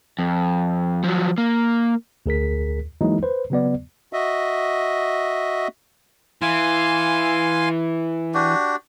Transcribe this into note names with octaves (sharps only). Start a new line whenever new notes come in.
F2
F3 F#3
A#3
D2 G#4 A#4 B6
E3 F#3 G#3 A#3 D#4 E4
B4 C5
C#3 F#3 B3 D5
F#4 D#5 E5
E3 F5 G#5 C6
D4 F#4 G4